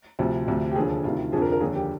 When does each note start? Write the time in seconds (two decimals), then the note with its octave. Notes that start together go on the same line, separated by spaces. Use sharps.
0.19 D2 C3 F3
0.48 D2 C3 F3
0.71 G4
0.76 D#2 D3 F3 G#4
1.04 D2 C3 D#3 F4
1.32 F2 D3 F3 G#4
1.42 A#4
1.52 A#4
1.60 D#2 D3 F3 G#4
1.75 G4